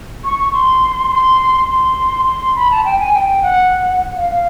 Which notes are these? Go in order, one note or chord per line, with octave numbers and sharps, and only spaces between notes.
C#6
C#6
C6
C6
C6
C6
B5
A5
G5
G#5
G5
F#5
F5
F5